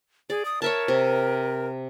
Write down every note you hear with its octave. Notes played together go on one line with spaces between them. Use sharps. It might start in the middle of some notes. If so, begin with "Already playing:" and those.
G#4 D5
D#6
A#4 C#5 E5 A5
C3